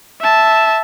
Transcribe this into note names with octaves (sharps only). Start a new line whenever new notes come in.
E5 A5